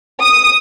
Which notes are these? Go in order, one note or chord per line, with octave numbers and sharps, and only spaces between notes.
D#6